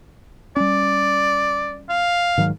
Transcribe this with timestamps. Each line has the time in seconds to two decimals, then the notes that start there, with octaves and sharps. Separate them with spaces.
0.56 G3 C#4 D5
1.89 F5
2.38 G#2 D#3 F#3